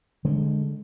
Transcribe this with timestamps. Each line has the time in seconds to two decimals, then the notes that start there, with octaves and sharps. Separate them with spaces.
0.25 D3 G#3